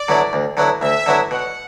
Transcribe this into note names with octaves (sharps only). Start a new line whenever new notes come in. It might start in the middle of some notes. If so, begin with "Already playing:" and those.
Already playing: D5
D3 F#3 B3 E4
D2
D3 F#3 B3 E4
D2 E5
D3 F#3 B3 E4
B2 F#5